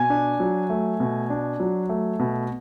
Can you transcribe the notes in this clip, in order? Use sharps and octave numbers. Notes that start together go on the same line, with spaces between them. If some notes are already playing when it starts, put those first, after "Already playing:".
Already playing: B2 G#5
D4
F#3
A3
B2
D4
F#3
A3
B2